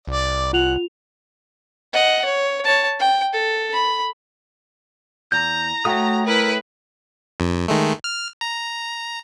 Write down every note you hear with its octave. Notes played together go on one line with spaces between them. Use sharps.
C2 D5
F4 F#5 F7
D#5 F#5
C#5
C#5 A5
G5
A4
B5
E2 A#5 G6
A3 F#4 C#5 G5 D#6
E4 A#4 B4
F2
D#3 G#3 A3
F6
A#5